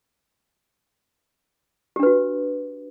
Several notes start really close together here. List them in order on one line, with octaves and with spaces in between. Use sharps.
G4 D4 B4 F#4